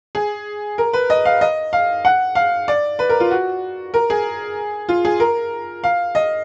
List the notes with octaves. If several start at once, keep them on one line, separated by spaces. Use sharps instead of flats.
G#4
A#4
B4
D#5
F5
D#5
F5
F#5
F5
D5
B4
A#4
F4
F#4
A#4
G#4
F4
G#4
A#4
F5
D#5